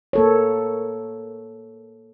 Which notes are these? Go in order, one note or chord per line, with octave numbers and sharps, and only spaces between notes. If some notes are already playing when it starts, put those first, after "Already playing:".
A#3 A4 C#5